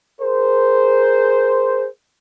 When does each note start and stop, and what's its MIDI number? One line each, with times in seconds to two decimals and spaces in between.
0.21 1.88 68
0.21 1.88 70
0.21 1.88 72